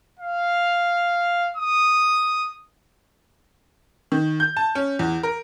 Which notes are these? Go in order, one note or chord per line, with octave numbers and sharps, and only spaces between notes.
F5
D#6
D#3
G6
A5
C#4
E2
A#4